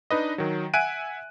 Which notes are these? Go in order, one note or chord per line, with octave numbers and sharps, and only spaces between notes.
D4 D#4 B4 D#5
D#3 F#3
E5 F#5 G#5 F#6 D7 D#7